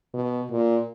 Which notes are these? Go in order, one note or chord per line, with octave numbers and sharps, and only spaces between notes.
B2
A#2